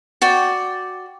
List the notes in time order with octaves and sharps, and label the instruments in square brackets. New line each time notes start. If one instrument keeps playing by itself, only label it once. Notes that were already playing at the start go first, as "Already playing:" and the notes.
[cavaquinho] F#4 D5 G5